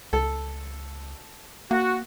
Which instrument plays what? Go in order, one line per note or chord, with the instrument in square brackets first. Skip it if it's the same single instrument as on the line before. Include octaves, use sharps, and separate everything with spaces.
[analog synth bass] C#2 [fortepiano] A4
[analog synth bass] A#3 [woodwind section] F#4